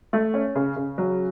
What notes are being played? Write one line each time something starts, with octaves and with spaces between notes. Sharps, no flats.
A3
C#4
C#3
C#3
F#3